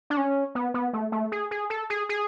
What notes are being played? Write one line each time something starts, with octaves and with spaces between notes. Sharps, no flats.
D4
C#4
B3
B3
A3
A3
G#4
G#4
A4
G#4
G#4